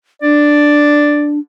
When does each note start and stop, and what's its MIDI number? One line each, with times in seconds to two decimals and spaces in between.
0.22 1.39 62
0.22 1.31 74